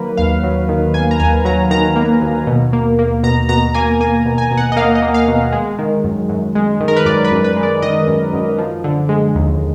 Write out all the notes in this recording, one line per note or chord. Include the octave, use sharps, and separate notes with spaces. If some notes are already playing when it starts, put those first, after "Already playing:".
Already playing: D#3 F#3 A#3 B4
D#2 F5
F#3
D#3
A#3 G#5
A#5
D#2 G#5
F#3 A#5
D#3 A#5
A#3
D#2
B2
A#3
A#3
B2 A#5
B2 A#5
A#3 G#5
A#3 G#5
B2
G#5
B2
F#5
D#5
A#3 F5
D#5
A#3
F5
B2
G#3
D#3
F#2
F#2
G#3
D#3
A#4
B4
F#2 D5
B4
F#2
B4
G#3
D5
D#3 D#5
F#2
F#2
F3
D3
G#3
D#2